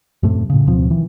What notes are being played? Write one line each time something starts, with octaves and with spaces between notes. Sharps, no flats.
F#2 A2 C3 A3
A2 C#3
D1 B2 F3 C4
D#3 E3